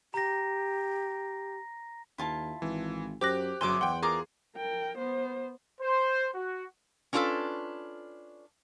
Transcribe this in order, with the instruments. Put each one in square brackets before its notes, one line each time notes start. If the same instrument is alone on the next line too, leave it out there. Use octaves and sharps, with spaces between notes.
[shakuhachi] G4 [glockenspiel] A#5 A#6
[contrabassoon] D#2 [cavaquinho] E4 F4 A5
[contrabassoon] G#1 [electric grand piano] E3
[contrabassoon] F#2 [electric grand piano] G4 D6 F#6 [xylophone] C5 A#6
[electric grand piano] G1 F#3 [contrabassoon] F#2 [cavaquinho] G#4 E5 D6 [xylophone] C6
[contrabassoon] E2 [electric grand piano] F#5 G5 [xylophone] C6
[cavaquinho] F4 A#4 D6 [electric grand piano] G#4
[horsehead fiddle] A#4 G5
B3 C5
[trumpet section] C5
F#4
[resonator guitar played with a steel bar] C#4 D4 F4 G4 A4 B4